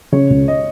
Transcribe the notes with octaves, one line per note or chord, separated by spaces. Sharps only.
C#3 C#5
C#2
D#5